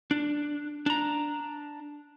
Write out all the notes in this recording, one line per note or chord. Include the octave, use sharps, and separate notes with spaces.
D4
D4 A#5